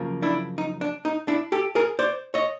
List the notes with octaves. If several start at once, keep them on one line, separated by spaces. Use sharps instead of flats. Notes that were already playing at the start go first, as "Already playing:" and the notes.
Already playing: F#2 C#3 F3 A#3
D4 E4
D#4
D4
D#4
D4 E4
G4 A4
G#4 A#4
C5 D5
C#5 D#5